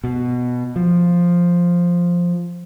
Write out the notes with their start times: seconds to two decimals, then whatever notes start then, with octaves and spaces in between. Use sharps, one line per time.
0.04 B2
0.76 F3